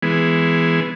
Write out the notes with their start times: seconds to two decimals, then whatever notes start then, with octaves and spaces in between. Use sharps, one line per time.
0.03 E3 G#3 B3